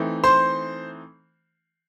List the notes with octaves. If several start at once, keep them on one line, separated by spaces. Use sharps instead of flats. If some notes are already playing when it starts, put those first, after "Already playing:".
Already playing: E3 A3 C4 D#4
C5 C6